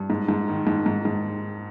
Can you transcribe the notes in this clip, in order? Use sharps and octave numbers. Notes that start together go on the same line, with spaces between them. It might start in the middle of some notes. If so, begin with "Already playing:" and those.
Already playing: G2
G#2
G#2
D#3
G#2
G#2
G#2